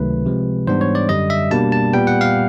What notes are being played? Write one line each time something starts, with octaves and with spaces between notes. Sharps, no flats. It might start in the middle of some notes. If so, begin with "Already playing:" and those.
Already playing: C#2 C3 D#3 F#3 A3 B4
C3 F3 G#3
G#2 E3 G3 B3 D4 C5
C#5
D5
F#2 D3 G3 D#5
E5
B2 G3 A#3 D4 A5
A5
A#2 G3 B3 G5
F#5
F5